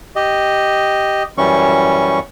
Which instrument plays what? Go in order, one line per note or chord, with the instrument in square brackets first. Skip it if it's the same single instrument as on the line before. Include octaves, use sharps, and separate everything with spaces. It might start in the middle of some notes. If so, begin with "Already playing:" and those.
[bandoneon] G4 D#5
F#2 E3 G3 C#4 C#6